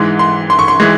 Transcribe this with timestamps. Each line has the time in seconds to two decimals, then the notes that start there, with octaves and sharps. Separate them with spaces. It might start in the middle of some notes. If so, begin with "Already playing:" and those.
Already playing: G#2 E3 G#3 C6
0.19 C6
0.50 C6
0.59 C#6
0.68 C6
0.80 E3 G#3